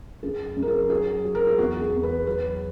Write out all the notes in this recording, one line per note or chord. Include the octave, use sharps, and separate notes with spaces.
F#2 G#4
F#2
A#4
G#4
F#3 G#4
F#3
A#4
G#4
E2 F#4
G#4
E2
B4
F#3 B4